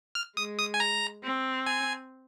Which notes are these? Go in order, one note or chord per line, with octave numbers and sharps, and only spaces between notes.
F6
G#3 D#6
D#6
G#5
A#5
C4
G#5